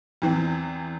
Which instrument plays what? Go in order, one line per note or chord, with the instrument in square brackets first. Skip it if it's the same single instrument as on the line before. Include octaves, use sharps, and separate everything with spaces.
[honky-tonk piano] E2 E3 C4